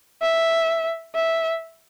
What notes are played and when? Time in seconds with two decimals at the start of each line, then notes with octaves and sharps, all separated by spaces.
0.21 E5
1.14 E5